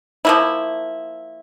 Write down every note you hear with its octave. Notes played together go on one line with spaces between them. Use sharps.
F3 A#3 E4